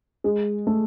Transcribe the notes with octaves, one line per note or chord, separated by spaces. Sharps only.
G#3
A3